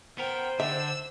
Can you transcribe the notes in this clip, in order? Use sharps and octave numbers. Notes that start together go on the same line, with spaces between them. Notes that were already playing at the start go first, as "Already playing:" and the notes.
B3 A#4 C5 G5
D3 D4 E5 E6